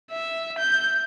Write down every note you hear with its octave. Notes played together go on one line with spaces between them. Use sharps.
E5
G6